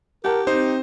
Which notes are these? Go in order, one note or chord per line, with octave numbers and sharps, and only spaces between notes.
G4 A#4 F#5 A5
C4 D#4 C5